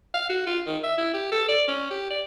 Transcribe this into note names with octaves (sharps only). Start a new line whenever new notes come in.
F5
F#4
F4
D#3
E5
E4
G4
A4
D5
C#4
G4
D5